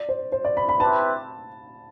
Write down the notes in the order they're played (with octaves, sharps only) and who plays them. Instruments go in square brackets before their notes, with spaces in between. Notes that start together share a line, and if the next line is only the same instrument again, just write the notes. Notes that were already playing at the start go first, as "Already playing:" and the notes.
Already playing: [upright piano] D5
C5
C5
D5
B5
B5
[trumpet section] C4 E4 G4 B4 [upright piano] A5